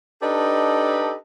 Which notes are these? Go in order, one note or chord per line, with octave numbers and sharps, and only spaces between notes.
D4 D#4 G4 A4 B4 D#5